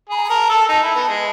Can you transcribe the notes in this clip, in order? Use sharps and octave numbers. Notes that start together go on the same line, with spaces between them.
G#4 B5
A#5
G#5
A#4 A5
A4
D#4 A5
E4
B3 A5
G#3